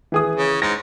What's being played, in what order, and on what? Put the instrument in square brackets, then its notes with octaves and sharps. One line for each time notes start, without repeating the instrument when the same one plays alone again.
[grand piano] E3 G#4 D#6
[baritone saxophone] C#3
[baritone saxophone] G#2 [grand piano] A#6